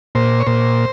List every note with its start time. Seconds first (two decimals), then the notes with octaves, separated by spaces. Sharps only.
0.15 A#2 C5
0.40 C#5
0.46 A#2 C5